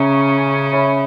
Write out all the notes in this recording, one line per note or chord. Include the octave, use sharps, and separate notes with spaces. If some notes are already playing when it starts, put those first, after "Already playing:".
Already playing: C#3 C#4 C#5 E5 A#5 C#6
C#5 E5 B5